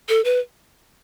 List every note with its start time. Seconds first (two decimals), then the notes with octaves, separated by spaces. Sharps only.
0.09 A4
0.24 B4